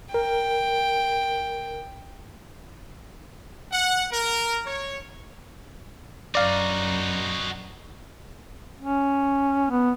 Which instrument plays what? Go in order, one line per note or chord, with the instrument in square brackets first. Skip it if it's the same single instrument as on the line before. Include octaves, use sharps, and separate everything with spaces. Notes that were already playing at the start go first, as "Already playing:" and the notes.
[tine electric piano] A#4 [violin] G5
[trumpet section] F#5
A#4
C#5
[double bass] F#2 [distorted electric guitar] D#4 F#4 [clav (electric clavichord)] D5 F5
[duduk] C#4
B3